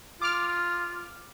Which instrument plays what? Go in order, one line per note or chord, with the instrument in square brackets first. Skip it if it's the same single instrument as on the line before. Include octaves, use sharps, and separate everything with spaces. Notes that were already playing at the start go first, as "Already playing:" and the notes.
[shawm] F4 [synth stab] D6 F6